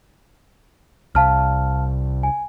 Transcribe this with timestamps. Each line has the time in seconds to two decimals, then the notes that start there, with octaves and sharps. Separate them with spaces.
1.15 C2 F5 A5 F6
2.23 G#5